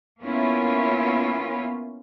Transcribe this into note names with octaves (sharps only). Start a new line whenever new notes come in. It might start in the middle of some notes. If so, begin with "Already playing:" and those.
A#3 B3 C#4 E4 F4